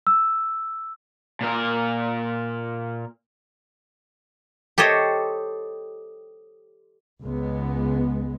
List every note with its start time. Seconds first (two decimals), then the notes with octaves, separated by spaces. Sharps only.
0.07 E6
1.41 A#2 A#4
4.78 G4 A4 C5 C#5 D#5
7.24 C#2 G#3 B3